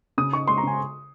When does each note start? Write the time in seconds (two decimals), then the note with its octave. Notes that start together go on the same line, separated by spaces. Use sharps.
0.18 C#3 D#6
0.33 D#4 C#6
0.48 G#3 C6
0.58 A#5
0.63 C#3 G#5